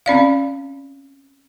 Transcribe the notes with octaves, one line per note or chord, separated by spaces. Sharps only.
C4 C#4 D5 F5